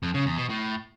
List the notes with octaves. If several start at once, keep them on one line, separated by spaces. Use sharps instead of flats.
F2
C#3
E2
B2
A2